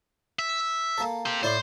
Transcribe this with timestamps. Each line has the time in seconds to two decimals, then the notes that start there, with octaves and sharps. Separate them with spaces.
0.39 E5
0.98 A#3 A4
1.26 G4 C5
1.43 A2 E4 C5 D5